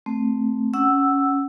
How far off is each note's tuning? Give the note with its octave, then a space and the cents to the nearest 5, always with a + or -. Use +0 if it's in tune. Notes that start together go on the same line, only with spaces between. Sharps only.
A3 +0 C4 +0
C#4 +5 F#5 +10 E6 +0